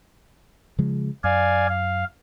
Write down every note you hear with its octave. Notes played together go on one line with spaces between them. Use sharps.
C#3 F3 G#3
F#2 D5 F5 G#5
F5